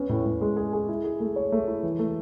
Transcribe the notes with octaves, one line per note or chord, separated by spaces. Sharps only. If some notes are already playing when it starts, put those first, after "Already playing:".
Already playing: B3 C#4
A2
A2
G#3
G#4
G#4
E4
G#4
A3
C#5
A3
E4
E3
A3